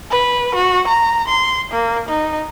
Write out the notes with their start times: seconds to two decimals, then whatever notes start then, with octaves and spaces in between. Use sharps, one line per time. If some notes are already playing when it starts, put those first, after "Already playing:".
0.11 B4
0.55 F#4
0.88 A#5
1.28 C6
1.72 A#3
2.09 D#4